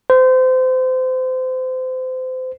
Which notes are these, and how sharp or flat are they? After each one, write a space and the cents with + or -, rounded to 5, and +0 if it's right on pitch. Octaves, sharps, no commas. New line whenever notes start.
C5 -30